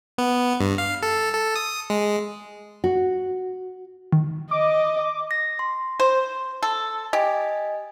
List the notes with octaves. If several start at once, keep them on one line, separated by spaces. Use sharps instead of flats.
B3
G2
F5
A4
A4
D#6
G#3
F#4
D#3
D#5 D6
A#6
C6
C5
A4
G4 D#5 G#5